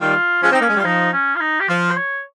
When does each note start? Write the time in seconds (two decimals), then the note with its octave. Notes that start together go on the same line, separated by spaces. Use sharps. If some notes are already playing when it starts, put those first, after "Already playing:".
0.01 D#3 G3 F4
0.43 F3 G#3 C#4
0.52 C4 D#4
0.60 A#3 C#4
0.69 G#3
0.76 G3 F4
0.84 F3 D#4
1.13 C#4
1.36 F4
1.41 D#4
1.60 G4
1.68 F3 F4
1.91 C5
1.96 C#5